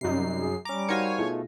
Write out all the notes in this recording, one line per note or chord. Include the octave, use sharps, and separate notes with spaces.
F#2 C3 G3 D#4 C7
G#4
G3 C#4 A#5 D6
D#4 F#4 A#4 C5 C#5 F5 G#5 A#6
B2 A3 D#4 F4 G#4